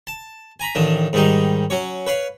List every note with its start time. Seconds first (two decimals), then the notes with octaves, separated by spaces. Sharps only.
0.07 A5
0.60 G#5 A#5 B5
0.75 A1 D#3 D4
1.13 G#2 D#3 G3 D#4
1.70 F#3 C#4 C#5
2.07 B4 C#5 F5